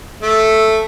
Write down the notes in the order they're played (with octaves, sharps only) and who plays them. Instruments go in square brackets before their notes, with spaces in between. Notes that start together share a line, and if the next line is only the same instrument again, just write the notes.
[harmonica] A3